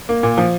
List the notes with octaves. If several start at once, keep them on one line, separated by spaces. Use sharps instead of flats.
A#3
A#2
F3